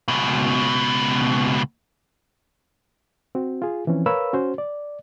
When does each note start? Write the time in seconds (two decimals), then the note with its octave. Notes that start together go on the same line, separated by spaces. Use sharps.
0.08 C#2 B2
3.35 C4 F#4
3.62 F4 G#4
3.87 E3 F3 C4 C#4
4.06 A#4 B4 C#5 F5 B5 E6
4.33 C#4 F#4 C5
4.58 D5